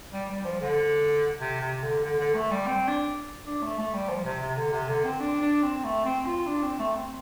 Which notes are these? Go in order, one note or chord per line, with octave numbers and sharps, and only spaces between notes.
G3
G3
F3
D3
C3
C3
D3
D3
D3
A3
G3
C4
D4
D4
A3
A3
G3
F3
C3
C3
D3
C3
D3
C4
D4
D4
C4
A3
C4
F4
D4
C4
A3
C4